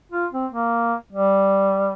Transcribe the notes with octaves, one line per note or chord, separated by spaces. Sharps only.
F4
C4
A#3
G3